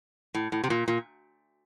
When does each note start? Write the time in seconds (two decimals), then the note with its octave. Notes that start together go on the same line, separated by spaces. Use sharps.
0.35 A2
0.52 A2
0.64 C3
0.70 A#2
0.88 A#2